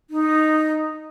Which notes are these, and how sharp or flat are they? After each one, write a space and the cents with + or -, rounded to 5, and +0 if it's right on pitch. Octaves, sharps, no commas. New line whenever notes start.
D#4 -5